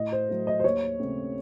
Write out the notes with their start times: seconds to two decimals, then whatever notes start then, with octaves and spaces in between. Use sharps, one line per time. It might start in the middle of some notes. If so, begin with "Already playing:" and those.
Already playing: A2 D#5
0.12 C5
0.29 F#3 A3
0.47 D#5
0.60 C5
0.64 D#2 C#5
1.00 C#3 A3 C4